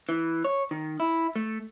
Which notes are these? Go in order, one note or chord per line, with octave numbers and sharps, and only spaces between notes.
E3
C#5
D#3
E4
A3